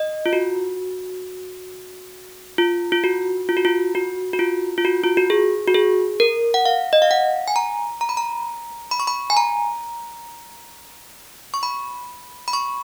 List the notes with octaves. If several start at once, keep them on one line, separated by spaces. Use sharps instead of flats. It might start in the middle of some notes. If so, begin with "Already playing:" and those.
Already playing: D#5
F4
F#4
F4
F4
F#4
F4
F#4
F4
F#4
F#4
F4
F4
F#4
F4
F#4
G#4
F#4
G#4
A#4
F#5
F5
D#5
F5
F#5
G#5
A#5
A#5
B5
A#5
B5
C#6
B5
G#5
A#5
C#6
B5
B5
C#6